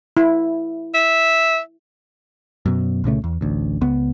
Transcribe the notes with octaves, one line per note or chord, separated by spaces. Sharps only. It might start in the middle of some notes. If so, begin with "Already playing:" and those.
E4
E5
F#2 B2
C2 A#2 C#3 A3
E2
A1 D2
C#2 B3